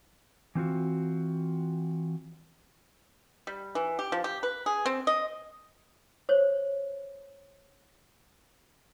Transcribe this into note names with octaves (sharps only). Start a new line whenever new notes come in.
E3 C4 F4 F#4
G3
E3
G4
F3
G4
B4
G#4
C4
D#5
C5 C#5